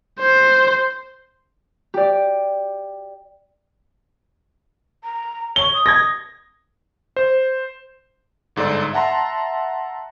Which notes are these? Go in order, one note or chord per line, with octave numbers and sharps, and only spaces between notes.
C5
G4 D5
A#5
C#5 G7
D#6
G#6 A#6
C5
G1 G#2 A4 D5 C6
E5 F#5 A5 A#5 C6